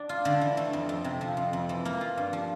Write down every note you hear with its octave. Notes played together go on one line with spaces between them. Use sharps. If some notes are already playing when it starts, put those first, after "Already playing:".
Already playing: D4
F4
D3
E3
A3
F2
F2
C3
F3
F2
F2
E3
A#3
F4
G2
F3